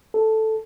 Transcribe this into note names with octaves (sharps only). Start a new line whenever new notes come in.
A4